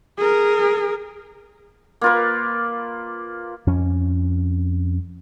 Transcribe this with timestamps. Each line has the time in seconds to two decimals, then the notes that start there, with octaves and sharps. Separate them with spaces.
0.18 G#4 A#4
2.01 A#3 F4 B4
3.67 F2 C#4